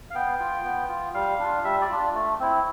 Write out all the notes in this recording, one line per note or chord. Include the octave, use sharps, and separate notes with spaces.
F5
B3 G5
F4
B3
F4
G3 F5
D4 F4
G3 E5
D5
D4 F4
A3
C4 E4